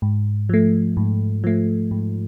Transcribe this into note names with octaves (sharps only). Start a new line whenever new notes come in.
G#2
F3 A3
G#2
F3 A3
G#2